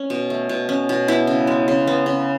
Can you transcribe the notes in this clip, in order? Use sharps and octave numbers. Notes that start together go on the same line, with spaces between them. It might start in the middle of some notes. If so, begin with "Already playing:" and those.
Already playing: C#4
B2
A3
B2
C#4
B2
B3 E4
C#3
G#3
C#3
B3
C#3